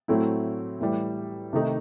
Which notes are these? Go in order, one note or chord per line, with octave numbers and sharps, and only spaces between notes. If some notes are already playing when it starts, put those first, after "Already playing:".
A2 F#3 A3 C4 E4
A2 E3 G3
C3 D#3 A3 D#4